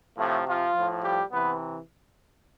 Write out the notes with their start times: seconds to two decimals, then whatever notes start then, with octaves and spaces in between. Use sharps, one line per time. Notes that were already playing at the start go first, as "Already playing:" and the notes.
0.17 A2 C3 F3 A3
0.46 F3 F4
0.74 A2 F3
1.03 G3 G4
1.31 C3 E3 B3 B4